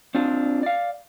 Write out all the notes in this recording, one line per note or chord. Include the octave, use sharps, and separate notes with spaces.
C4 D4 F4
D5 F5